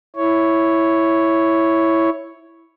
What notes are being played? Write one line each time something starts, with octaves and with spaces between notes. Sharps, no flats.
E4 C#5